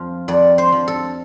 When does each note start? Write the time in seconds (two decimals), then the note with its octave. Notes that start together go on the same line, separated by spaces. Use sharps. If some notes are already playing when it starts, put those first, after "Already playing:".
Already playing: F2 F3 F5
0.28 F2 D5
0.58 C5
0.72 F3
0.88 A4